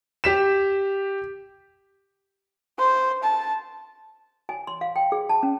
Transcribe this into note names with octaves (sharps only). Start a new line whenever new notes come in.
G4 B6 E7
C5
A5
G#5
C6
F5
G5
G#4
A5
C#4